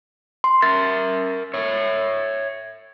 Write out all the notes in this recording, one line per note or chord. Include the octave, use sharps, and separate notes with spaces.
C6
A#4 E5 A6
C#5 E5